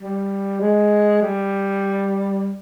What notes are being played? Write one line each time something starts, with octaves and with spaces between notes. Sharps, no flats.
G3
G#3
G3